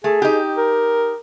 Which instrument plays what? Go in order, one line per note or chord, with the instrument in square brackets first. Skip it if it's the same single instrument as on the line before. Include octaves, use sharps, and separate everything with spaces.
[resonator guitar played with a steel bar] A3 [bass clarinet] G#4
[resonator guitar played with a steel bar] D#4 G4
[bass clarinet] A#4